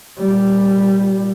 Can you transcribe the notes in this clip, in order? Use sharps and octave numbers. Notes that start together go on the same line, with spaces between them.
A#2 G3